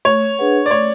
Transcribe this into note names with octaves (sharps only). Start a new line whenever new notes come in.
A3 C#5
D4 G#4 B4 F#5
D5
A3 C#5